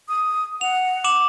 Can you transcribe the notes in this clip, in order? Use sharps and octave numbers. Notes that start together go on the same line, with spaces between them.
D#6
F#5 F7
D6 E7 F#7